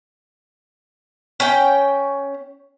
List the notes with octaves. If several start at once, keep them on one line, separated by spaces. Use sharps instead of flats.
C#4 G5